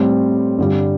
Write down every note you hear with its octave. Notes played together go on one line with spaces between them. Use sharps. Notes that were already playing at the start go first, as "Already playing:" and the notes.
Already playing: A2 G3 C4
G2 D3 G3